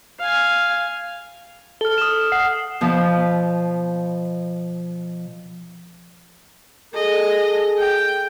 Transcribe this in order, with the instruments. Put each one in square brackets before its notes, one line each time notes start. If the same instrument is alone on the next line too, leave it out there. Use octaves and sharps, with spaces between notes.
[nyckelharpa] F5 G#5
[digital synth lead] A4 [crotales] F6 G7
[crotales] D#6 E7
[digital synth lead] F#5 [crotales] C7
[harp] B2 F3
[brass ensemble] G#4 A4 [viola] D#5
[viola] G5